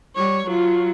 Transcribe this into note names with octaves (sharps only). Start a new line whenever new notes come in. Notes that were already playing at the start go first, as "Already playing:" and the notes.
G3 C#5
F#3 F4